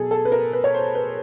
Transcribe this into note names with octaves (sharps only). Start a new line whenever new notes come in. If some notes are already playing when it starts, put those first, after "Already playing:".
Already playing: B2 F#3 G#4 A4
A4
B4
A#4
B4
C#5
C5
B4